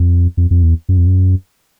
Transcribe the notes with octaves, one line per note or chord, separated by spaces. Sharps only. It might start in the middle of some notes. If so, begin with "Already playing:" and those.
Already playing: F2
F2
F2
E2
F#2
F2
F#2